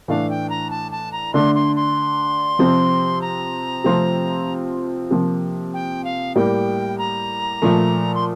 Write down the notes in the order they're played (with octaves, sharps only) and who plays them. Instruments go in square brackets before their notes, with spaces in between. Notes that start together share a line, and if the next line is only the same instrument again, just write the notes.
[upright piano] A2 E3 A3 D4 [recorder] F5
[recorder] G5
A#5
A5
A5
A#5
[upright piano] D3 A3 D4 [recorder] C6
[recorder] C6
C6
[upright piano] C3 F3 C4
[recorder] A#5
[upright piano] C3 F3 A3 C4 F4
C3 F3 A#3
[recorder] G5
F5
[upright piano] A2 G3 A#3 [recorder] G5
[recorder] A#5
[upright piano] A#2 F3 A3
[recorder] C6